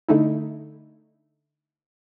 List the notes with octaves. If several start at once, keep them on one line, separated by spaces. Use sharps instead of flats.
D3 A3 D#4 E4